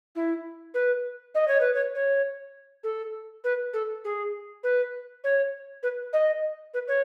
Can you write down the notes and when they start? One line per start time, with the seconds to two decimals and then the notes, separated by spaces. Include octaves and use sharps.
0.16 E4
0.74 B4
1.35 D#5
1.48 C#5
1.61 B4
1.74 C#5
1.95 C#5
2.84 A4
3.44 B4
3.73 A4
4.05 G#4
4.63 B4
5.24 C#5
5.83 B4
6.13 D#5
6.74 B4
6.88 C#5